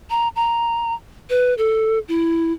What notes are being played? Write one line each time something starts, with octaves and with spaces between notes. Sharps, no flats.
A#5
A#5
B4
A4
E4